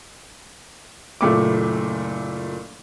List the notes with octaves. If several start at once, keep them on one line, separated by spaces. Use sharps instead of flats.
F#1 A#2 A3 D6